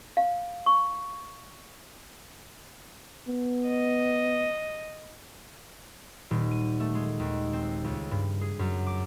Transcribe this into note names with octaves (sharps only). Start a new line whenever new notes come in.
F5
C#6
B3
D#5
D#1
D#7
A3
G#3
D#2
C4
C#2
G2
G#4
F#2
D6